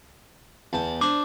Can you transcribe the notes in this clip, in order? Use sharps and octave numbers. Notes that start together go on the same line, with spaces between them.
E2 A5
D4 C5 D6